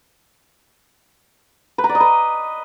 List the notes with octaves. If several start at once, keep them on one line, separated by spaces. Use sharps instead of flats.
B4
A#5
D5
D#5
B4